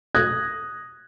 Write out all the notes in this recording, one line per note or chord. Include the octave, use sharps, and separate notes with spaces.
D#6 F#6 G#6 A#6